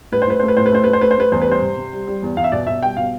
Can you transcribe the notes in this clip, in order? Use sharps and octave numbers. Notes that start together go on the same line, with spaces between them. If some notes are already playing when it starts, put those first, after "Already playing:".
A2 B4
C5
A2 B4
A3 C5
B4
A2 C5
B4
A3 C5
A3 B4
C5
A3 B4
C5
A3 B4
E2 C5
B4
G3 C5
C3
C3
G3
G3
E2
E2 F5
E5
B2 D5
B2 E5
G3 G5
B2 F5